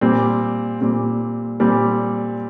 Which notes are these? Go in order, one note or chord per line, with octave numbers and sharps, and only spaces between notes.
A#2 G3 C4
A#2 G3 C4
A#2 G3 C4